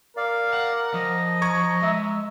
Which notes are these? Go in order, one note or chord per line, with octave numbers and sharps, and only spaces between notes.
A#4 D5 F5
F#5
F3 D#5
A#5 C#6 G#6
G#3 E5